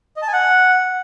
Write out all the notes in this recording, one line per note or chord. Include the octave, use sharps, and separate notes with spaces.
D#5
A5
G#5
F#5